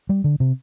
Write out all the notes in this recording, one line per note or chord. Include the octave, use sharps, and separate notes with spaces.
G3
D3
C3